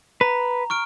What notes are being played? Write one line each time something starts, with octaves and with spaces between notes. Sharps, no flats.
B4 A#5
C#6 F6 D7